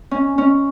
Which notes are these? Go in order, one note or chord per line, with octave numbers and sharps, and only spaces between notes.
C#4
C#4